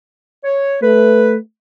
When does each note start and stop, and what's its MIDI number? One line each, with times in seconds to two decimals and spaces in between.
0.43 0.74 73
0.81 1.36 57
0.81 1.33 71